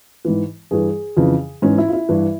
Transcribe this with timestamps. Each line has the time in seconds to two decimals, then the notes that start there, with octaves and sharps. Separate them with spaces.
0.25 G#2 E3
0.71 G2 E3 G#4
1.17 F2 C#3 E3
1.62 G#2 E3 C#4
1.78 E4
1.88 F4
1.93 E4
2.09 G2 E3